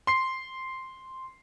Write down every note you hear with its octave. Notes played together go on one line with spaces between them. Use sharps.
C6 C7